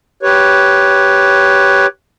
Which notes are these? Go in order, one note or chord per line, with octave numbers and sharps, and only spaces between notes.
G4 B4 C#5